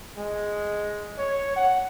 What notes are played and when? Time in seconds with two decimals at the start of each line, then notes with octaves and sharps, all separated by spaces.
0.18 G#3
1.18 C#5
1.56 F#5